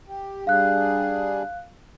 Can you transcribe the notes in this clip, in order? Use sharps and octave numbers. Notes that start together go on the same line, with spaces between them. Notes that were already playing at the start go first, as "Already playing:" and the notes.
G4
G3 D4 G#4 F5 F#6